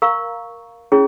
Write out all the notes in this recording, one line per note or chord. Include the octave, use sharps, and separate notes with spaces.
A#4 F5 A#5 C#6
C#4 E4 G#4 C#5